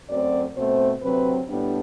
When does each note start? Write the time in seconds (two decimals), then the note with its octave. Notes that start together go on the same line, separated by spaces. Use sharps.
0.10 F#2 F#3 A3 C4 D5
0.56 B2 A3 C4 C5
1.02 D2 C3 F#3 C4 B4
1.49 A2 G3 B3 D4